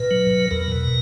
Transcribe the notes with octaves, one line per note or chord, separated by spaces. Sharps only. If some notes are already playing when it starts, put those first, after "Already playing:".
Already playing: A#2 B4
F#3
A#2
E2 A#4
B2